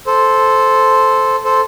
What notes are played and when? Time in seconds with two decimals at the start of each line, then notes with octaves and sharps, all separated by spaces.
0.06 A4 C5
1.45 A4 C5